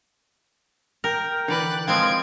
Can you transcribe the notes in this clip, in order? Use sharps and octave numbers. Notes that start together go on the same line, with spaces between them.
A#4 G5
D3 E3 B4 D5 F#6
F3 G#3 C4 F5 G#6 D7